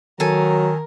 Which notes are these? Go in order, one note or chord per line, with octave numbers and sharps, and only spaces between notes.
D#3 F#3 A4 A#4 G#5